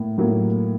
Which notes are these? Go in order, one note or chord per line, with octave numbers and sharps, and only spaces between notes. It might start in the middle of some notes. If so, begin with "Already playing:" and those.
Already playing: A2 A#3
A2 F#3 A#3